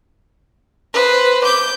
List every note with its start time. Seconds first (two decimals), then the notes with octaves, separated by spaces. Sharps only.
0.93 B4 C5
1.43 D6 G6